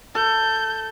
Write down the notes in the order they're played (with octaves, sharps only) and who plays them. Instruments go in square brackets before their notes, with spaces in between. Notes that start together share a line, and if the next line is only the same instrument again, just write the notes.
[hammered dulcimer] A4 [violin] G6